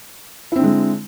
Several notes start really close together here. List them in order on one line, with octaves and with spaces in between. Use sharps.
E4 C4 D3 G#3